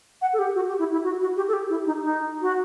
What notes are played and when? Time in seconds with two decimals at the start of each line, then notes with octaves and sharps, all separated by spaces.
0.22 F#5
0.33 A4
0.39 G4
0.55 F#4
0.68 G4
0.79 E4
0.92 E4
1.04 F#4
1.21 F#4
1.37 G4
1.48 A4
1.53 G4
1.70 E4
1.86 D#4
2.03 D#4
2.42 F#4